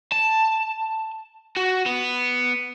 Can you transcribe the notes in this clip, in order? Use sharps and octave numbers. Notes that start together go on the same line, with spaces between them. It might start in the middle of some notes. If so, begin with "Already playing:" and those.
A5
F#4
B3